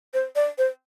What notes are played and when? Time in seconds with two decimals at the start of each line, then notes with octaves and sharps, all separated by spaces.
0.14 C5
0.36 D5
0.58 C5